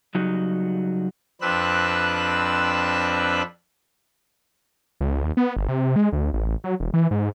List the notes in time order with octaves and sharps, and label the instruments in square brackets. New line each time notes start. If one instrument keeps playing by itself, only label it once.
[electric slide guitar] C#3 F#3 G3 D#4 F#4
[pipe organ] F2 C4 D4 B4 E6 F#6
[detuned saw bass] C#2
D#2
B3
G1
C3
G#3
D2
A1
F#3
E1
E3
G#2